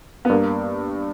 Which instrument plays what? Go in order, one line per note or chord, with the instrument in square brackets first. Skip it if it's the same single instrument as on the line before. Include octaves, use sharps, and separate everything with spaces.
[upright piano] B3
[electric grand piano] G2 [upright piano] A#3